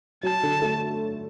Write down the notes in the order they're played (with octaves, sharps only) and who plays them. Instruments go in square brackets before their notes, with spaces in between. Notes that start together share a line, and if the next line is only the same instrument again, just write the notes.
[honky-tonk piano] F#3 [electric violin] A5
[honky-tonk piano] D3
A3